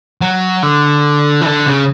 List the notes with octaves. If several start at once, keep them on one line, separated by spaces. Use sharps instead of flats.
F#3
D3
E3
D3
C#3